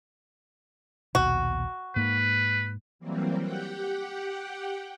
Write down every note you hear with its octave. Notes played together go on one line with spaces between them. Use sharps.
A#1 D#2 B2 F#4
G#2 A#3 B4
E3 F#3 G3 A#3 C4
G4 F#5 G5